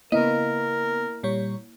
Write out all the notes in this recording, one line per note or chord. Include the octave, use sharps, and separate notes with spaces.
C#3 A#3 B3 E4 A#4 D#5
A#2 G3 C#5